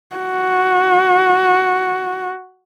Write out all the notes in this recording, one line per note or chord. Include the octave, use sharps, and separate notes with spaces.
F#4